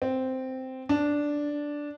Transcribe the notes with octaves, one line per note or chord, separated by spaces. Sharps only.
C4
D4